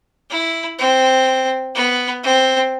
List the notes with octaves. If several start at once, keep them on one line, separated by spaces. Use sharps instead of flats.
E4
C4
B3
C4